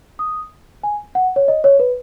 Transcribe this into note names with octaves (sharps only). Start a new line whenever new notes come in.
D#6
G#5
F#5
C#5
D#5
C#5
B4